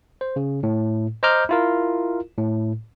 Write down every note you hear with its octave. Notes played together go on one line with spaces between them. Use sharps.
C5
C#3
A2
C5 D#5 A#5 D6 F6 G6
E4 F4 A#4
A2